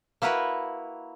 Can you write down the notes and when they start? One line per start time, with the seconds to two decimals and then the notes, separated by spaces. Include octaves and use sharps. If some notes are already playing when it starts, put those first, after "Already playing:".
0.22 A#3 E4 F#4 A#4 B4